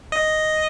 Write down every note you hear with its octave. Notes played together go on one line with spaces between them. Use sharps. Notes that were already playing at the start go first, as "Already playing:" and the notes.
D#5